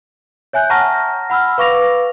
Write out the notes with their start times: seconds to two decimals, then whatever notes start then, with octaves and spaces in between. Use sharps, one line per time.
0.53 C#5 E5 G#5 F#6 G6
0.70 F#5 A5 A#5 C#6 F6 A#6
1.30 F#5 B5 E6 F6
1.58 B4 F5 C#6 D6 A#6 F7